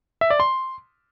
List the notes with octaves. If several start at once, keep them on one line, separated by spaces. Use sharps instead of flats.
E5
D5
C6